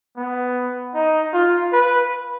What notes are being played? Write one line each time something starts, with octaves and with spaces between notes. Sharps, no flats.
B3
D#4
F4
B4